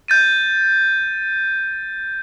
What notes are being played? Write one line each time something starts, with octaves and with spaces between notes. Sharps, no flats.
G6 A6 D#7